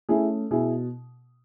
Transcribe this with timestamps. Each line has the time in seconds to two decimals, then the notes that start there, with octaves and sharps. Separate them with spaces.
0.09 A3 C#4 E4 G#4
0.51 B2 E4 G#4